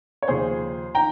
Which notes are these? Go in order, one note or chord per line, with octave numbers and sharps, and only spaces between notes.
C#5
D#2 C#3 F3 G#4 C5
D#3 G5 A#5